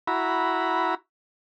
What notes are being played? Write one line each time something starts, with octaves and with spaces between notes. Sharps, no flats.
E4 F#4 A#5 B5